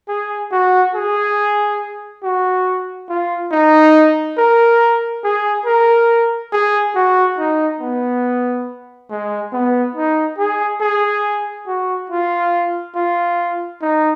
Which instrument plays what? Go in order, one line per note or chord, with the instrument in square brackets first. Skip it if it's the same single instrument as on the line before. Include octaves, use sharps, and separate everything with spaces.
[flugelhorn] G#4
F#4
G#4
F#4
F4
D#4
A#4
G#4
A#4
G#4
F#4
D#4
B3
G#3
B3
D#4
G#4
G#4
F#4
F4
F4
D#4